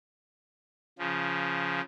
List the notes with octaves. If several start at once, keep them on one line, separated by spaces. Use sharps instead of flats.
C#3 F3